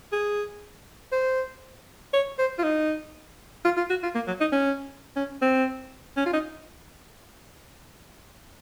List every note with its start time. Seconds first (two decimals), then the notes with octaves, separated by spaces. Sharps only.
0.12 G#4
1.12 C5
2.13 C#5
2.38 C5
2.58 F4
2.63 D#4
3.64 F4
3.77 F4
3.90 F#4
4.03 F4
4.15 A#3
4.27 F#3
4.40 D#4
4.52 C#4
5.16 C#4
5.41 C4
6.17 C#4
6.26 F4
6.33 D#4